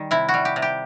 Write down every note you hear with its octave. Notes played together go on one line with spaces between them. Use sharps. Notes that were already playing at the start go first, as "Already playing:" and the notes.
Already playing: D#3 G3
C3 E4
F#4
G3
G4
C3
G4